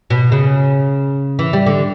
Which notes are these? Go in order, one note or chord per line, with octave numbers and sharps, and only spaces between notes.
B2
C#3
E3
G3
D3